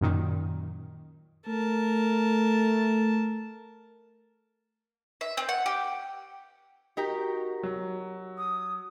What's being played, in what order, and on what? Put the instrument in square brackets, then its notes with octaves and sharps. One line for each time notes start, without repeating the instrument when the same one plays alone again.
[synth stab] F#2 A#2 D#3
[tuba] A3 [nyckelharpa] A#4 A5
[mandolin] E5
C4
F#5
G4
[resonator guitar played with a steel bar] D#4 G4 A#4 [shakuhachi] F#4
[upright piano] F#3
[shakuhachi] D#6